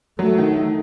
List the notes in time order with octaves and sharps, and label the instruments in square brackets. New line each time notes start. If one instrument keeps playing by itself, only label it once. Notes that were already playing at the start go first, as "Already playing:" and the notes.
[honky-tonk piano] F#3 [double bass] A3
[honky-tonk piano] D#3
D#3